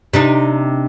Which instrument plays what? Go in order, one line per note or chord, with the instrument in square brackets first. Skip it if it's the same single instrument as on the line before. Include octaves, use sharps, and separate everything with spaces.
[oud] C3 D4 D#4